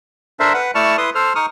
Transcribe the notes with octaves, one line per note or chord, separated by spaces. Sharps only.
D4 A4 A#4 C5 E5
B4 F#5
A3 E4 D5 A5 C#6 F6
E4 B4 C6 D#6
A4 C5 F6
D#4 C#6 D#6 F6